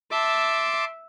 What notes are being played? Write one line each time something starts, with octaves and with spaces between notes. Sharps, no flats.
E5 A5 C6 D6